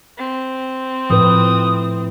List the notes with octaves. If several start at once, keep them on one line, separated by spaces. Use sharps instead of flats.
C4
A2 F3 B4 D#6